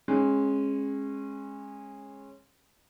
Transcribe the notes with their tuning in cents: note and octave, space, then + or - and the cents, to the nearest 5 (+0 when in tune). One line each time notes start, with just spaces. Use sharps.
G#3 +0 C#4 -25